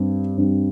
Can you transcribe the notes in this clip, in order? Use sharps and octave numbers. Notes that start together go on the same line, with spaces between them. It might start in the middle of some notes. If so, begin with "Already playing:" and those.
Already playing: G2 G3 C4
G2 G3 C4